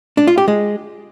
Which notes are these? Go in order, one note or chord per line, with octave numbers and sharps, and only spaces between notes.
D4
F4
G4
G#3